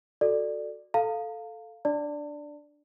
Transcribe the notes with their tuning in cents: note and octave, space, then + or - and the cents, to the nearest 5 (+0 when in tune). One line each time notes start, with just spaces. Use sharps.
F#4 +0 A4 +5 D5 +10
A4 +0 F5 +0 A#5 -45
D4 +0 D5 +0 A5 +35